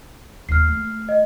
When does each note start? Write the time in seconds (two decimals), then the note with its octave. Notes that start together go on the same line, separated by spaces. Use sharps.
0.49 D#2 D#3 F6 C7
0.68 A3
1.09 D#5